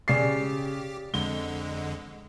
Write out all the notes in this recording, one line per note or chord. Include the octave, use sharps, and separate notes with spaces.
C#3 G4 D5 A6 C7
F2 D3 G#3 G7